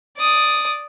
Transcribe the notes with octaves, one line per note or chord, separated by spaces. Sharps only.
D5 D#6